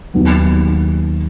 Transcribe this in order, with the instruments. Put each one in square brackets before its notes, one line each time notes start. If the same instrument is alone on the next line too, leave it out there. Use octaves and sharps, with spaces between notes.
[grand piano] D#2 D#3 F#3 B3